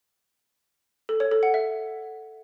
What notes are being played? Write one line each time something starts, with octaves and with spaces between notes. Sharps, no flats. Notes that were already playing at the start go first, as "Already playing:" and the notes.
A4
C#5
A4
F#5
E5